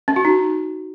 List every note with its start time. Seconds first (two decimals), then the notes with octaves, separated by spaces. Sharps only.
0.08 C#4
0.16 F#4
0.25 D#4